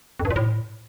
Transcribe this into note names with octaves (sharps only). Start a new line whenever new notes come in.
F2
G2
A#2
A2